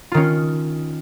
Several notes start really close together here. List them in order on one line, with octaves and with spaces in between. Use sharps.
F4 D#3 C#4